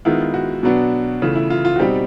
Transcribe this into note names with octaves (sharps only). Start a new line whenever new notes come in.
D#3 G#3 B3 E4 F4
F#4
B2 F#3 B3 D4
C#3 E3 A3 F4
E4
F4
F4
F#4
B2 G3 C4 D#4 G4